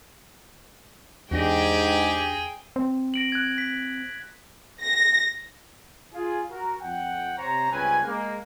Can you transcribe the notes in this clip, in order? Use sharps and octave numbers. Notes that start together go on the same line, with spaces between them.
E2 G#2 D4 G4 G#4 G5 A#6
C4
A#6 D7 F#7
F#6 G#6
B6
A#6
F4 G#4
F#4 A#4
F2 F#5 G5
C3 C4 C5 C#5 A#5
C#2 G2 C4 C#4 B4 G#5
G#3 A#3